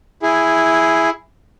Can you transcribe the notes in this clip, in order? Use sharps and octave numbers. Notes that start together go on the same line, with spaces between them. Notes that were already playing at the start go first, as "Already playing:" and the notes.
E4 G#4